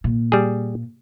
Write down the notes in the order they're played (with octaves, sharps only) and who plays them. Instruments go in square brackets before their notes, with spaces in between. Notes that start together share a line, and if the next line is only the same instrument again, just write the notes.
[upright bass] A#2
[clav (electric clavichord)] G3 G#4